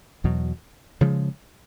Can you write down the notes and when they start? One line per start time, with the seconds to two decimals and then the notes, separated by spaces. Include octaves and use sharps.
0.24 E2 B2 F#3
1.01 C#3 F3 G#3